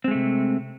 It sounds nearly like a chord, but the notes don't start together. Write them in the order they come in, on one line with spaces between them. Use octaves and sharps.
C4 G#3 A3 C3